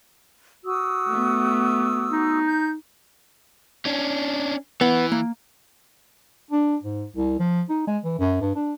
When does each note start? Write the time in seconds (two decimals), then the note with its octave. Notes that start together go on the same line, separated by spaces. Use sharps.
0.65 F#4 D#6 E6
1.09 A3 B3
2.11 D#4
2.46 G6
3.86 C#4 D4
4.81 E3 B3 F#5
5.12 A#3
6.51 D4
6.83 G#2
7.15 C2
7.39 F3
7.69 D#4
7.87 G#3
8.04 E3
8.19 F#2
8.41 G2
8.55 D4